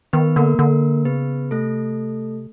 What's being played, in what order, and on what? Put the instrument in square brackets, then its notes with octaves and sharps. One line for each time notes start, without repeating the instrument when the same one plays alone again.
[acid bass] D#3 [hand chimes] B3 B4
[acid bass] D3 [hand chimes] A#3 A#4
[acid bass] D3 [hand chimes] A#3 A#4
[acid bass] C#3 [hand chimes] B3 B4
[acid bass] C3 [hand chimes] A3 A4